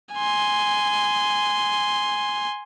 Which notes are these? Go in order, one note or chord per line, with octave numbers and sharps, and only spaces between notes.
G#5 C6